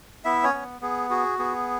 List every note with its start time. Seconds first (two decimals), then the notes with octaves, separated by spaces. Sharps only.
0.25 B3 E4 E5
0.44 C#4 C#5
0.53 B3
0.81 B3 G#4
1.10 F#4 G#4
1.39 B3 G#4